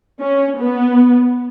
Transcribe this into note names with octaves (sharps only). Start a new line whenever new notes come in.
C#4
B3